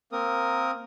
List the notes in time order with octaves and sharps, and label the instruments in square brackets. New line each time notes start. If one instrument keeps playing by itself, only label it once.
[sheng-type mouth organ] A#3 C4 A#4 D#6